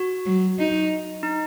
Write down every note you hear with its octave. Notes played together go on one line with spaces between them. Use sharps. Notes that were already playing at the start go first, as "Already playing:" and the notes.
Already playing: F#4
F#3
D#4
D#4